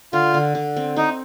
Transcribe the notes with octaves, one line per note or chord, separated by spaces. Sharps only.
D3 F4
D3
D3
C4
C4 D#4